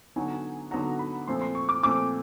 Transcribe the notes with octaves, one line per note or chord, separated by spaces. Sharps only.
D3 F#3 B3 D#4 F#4 G#5
D3 F#3 B3 D#4 F#4 A#5
B5
A#2 F3 A3 C4 C6
C6
C#6
D6
A#2 F3 A3 C4 D6